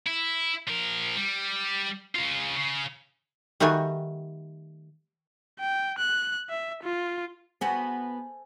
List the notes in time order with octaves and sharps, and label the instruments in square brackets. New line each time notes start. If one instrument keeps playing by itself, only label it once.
[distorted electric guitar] E4
F3 A#4
G3
C#3 F4
C#3
[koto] D#3 G3 A3 F#4 G#5
[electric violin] G5
F#6
E5
F4
[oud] B3 F#4 [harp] A4 C5 G#5